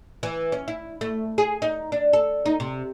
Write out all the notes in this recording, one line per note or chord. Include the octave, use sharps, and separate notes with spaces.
E3
C#4
E4
A3
G#4
D#4
D4
A4
D#4
C3